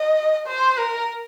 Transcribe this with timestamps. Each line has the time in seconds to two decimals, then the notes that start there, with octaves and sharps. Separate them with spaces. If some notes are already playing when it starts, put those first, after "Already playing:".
Already playing: D#5
0.46 C5
0.78 A#4